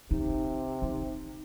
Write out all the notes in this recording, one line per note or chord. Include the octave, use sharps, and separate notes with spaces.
C3 D#4
D#4